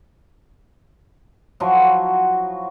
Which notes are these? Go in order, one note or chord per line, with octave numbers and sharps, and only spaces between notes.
F3 F#3 E4 F#4